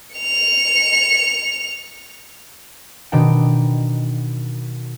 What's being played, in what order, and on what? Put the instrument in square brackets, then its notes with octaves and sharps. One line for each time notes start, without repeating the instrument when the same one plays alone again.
[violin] C#7 F7
[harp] B2 D#3 D4 G5